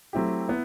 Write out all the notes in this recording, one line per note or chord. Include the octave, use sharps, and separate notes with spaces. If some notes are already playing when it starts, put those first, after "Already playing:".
F#3 A3 C4 E4 G4
B3 E4